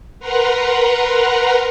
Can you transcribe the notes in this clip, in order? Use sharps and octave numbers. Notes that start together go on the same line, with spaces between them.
A#4 B4 F#5 A#5 C6